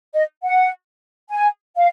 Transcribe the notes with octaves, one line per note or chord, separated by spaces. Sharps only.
D#5
F#5
G#5
F5